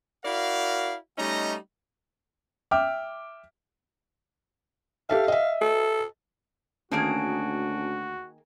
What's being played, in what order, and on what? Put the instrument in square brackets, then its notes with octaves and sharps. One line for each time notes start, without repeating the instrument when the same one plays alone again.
[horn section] E4 F#4 A#4 D5 F5
G3 A3 C#4 D#4 D#5 A#5
[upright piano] E5 G5 D6 F6
[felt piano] G4 A4 E5 [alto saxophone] F5
[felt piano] D#5 E5
[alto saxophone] A4
[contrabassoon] D2 [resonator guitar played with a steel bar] D#3 A#3 G#4 [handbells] C#4 A5 D7 [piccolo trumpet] F#4